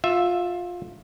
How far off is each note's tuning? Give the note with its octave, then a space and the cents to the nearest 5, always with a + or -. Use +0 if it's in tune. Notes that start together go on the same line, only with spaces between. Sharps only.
F4 +20 E5 +0